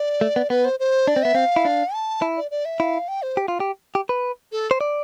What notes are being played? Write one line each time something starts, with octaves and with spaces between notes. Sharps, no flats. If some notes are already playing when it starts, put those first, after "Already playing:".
Already playing: D5
A3
B3
B3 B4
C5
C5
D4 D5
C4
B3 E5
C4 F5
E4
D4
A5
E4
D5
D5
E5
E4 F5
G5
C5
G4
F4
G4
G4
B4
A4
C5
D5